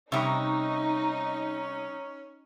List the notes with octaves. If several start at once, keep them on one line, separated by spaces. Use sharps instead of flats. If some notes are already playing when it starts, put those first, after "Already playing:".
C3 G3 C#4 D#4 C#6 D#6 E6